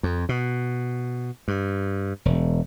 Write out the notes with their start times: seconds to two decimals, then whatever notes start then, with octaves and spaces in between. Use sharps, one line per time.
0.03 F2
0.29 B2
1.48 G2
2.25 E1